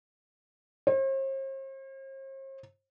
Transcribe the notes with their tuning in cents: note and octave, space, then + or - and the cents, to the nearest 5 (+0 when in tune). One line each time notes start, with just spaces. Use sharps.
C5 +45